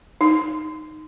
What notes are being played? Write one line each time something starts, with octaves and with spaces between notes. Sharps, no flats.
D#4